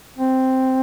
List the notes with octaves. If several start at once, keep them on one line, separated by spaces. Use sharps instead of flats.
C4